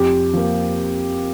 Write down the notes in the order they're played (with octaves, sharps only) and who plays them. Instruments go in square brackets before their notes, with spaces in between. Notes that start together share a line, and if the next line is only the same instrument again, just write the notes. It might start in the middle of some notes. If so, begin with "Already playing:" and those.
Already playing: [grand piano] F2 G4
F3 A#3